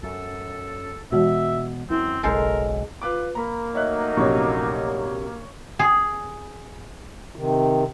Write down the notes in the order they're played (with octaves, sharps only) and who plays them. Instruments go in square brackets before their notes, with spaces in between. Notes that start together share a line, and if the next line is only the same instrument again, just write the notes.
[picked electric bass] F#2 [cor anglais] A4
[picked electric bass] B2 [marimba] E3 G#3 F#4 [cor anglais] E5
[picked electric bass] F#2 [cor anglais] C4 [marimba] E4
[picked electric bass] F#1 B1 F#2 [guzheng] G#3 A4 C5 [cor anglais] A#4
[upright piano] F4 B4 D6
[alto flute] A#3 [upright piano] A#5 B5
[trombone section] F#3 A3 D#4 [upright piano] C#5 E5 F#6 [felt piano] D#5
[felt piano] A#1 F#2 C3 [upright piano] C#5 C#6
[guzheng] G#4
[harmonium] C3 D#3